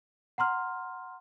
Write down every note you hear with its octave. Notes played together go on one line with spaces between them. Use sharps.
F#5 A#5 C6 F6